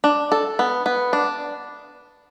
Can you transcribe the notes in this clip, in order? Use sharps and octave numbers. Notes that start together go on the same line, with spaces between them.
D4
A4
B3
B3
D4